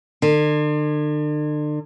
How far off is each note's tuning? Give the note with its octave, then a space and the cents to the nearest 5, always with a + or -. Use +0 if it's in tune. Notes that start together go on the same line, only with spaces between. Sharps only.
D3 +40